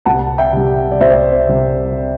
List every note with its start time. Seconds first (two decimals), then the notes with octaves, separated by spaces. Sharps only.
0.05 C2 F#5 A5
0.38 E5 G5
0.53 C3 G3
0.91 D5
1.00 C2 C5 E5
1.49 C3 G3